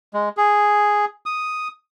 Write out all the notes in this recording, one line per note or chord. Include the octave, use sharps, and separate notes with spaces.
G#3
G#4
D#6